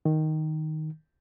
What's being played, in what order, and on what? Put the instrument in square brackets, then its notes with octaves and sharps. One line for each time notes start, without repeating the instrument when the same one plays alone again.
[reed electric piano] D#3